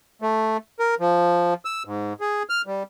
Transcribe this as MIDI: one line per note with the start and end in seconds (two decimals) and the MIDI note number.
0.22 0.57 57
0.80 0.95 70
1.00 1.54 53
1.65 1.83 88
1.85 2.13 44
2.21 2.43 68
2.50 2.62 89
2.67 2.83 55